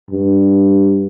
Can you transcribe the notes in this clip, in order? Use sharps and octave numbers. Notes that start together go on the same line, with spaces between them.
G2